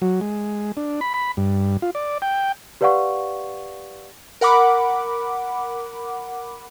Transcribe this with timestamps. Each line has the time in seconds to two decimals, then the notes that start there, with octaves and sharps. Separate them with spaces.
0.02 F#3
0.21 G#3
0.77 D4
1.01 B5
1.14 B5
1.37 G2
1.82 F4
1.95 D5
2.22 G5
2.81 G4 B4 D5 F5 F#5 C#6
4.41 A#4 F#5 B5 D6